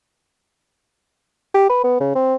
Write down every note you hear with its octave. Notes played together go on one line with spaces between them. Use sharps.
G4
B4
B3
C#3
C4